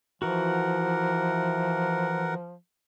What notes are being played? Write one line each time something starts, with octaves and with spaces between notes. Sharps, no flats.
E3 F3 F#4 A#4 F#5